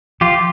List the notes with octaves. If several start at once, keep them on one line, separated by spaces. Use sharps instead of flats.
F3 F4 G4